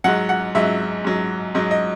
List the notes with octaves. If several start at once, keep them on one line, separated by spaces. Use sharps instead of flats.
G#2 F#3 F#5
F#5
G#2 F#3 E5
G#2 F#3
G#2 F#3 D#5
D#5